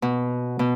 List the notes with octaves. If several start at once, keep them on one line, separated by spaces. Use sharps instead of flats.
B2
B2